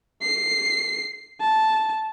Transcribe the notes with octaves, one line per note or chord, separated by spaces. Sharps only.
C7
A5